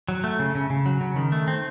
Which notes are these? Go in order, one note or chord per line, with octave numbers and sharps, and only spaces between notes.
F#3
A3
C#3
C#3
C#3
F#3
C#3
D#3
A3
C4